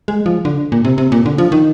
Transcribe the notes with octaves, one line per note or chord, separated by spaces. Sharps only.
G#3
F3
D3
A#2
C3
C3
A#2
D3
F3
D#3